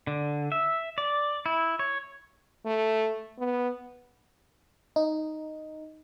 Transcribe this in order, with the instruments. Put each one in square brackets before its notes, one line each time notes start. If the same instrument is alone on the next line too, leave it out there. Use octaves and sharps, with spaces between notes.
[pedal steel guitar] D3
E5
D5
E4
C#5
[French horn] A3
B3
[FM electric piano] D#4